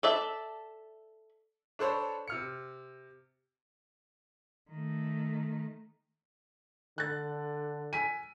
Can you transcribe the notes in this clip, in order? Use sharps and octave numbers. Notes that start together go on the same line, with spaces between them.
A4 D5 E5
D4 A4 C5 C#5 B5
C3 F6 C#7
D#3 A3
D3 F#6 A6
G#5 B6 D#7